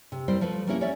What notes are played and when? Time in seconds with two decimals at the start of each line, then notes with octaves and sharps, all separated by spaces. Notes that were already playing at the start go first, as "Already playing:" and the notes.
0.12 C3
0.28 G3 C4 E4 A#4 C5
0.41 F3 A3 B4
0.67 G3 A#3 C4 C#4 E4 A#4
0.81 C#4 C#5 D5 E5